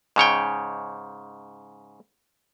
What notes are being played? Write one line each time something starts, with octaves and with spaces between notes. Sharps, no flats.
G#2 C#3 C#5 G5